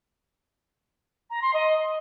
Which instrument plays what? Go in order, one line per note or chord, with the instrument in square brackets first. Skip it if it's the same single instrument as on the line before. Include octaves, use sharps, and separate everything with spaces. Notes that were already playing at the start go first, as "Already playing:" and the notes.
[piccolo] A#5
C6
D#5